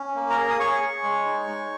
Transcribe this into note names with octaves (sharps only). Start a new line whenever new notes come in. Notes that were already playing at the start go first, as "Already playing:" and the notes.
Already playing: C#4
A#3
A#4 A#5
G#4
D#6
G#4 C#5 C#6
G#4
G#3
D#4
G#3